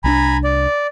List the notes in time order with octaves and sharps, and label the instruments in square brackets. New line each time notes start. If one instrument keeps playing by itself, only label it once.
[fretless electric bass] C2 C#4 D4 [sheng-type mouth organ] G#5 A#5 B5
[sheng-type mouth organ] D5